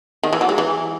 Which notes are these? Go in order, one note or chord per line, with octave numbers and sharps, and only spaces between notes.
D#3
E3
F#3
G#3
E3